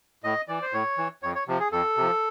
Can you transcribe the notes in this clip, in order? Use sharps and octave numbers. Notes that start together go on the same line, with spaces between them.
A2 D#5
E3 D5
C5
A2 C#5
E3
F2 C#5
C#5
C3 F3
G#4
F2 A4
C3 F3